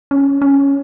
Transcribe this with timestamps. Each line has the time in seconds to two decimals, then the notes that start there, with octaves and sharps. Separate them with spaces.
0.11 C#4
0.42 C#4